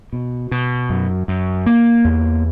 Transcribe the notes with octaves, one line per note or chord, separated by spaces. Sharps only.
B2
B2
F#2
F#2
A#3
E2